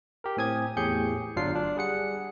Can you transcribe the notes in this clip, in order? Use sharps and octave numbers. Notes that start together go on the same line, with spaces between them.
G4 A#4
A2 C4 G#5 D#6 G#6
E2 A2 G4 G#4 G6 C#7
G1 F#3 D4 F4 F5 C7
D4
G3 G#4 F#5 C#7